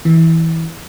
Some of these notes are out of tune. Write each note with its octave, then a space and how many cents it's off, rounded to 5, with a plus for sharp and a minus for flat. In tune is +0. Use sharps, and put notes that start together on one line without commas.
E3 -15